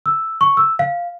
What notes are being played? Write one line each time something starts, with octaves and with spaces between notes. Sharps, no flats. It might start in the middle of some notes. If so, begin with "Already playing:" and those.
E6
C#6
E6
F5